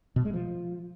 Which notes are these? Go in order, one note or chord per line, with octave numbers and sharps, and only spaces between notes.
B2
G#3
F3